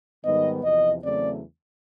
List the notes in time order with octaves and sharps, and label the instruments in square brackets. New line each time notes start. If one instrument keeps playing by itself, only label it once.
[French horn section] G#2 D#3 G3 B3 D#5
E2 C3 F3 D#5
E2 C#3 F#3 A3 C4 D5